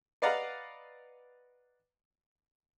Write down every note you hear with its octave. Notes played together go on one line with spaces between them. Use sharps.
B4 D5 D#5 F5 F#5 A#5